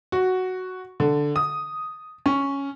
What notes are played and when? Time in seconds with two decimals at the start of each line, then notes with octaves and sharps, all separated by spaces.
0.12 F#4
1.00 D3
1.36 D#6
2.26 C#4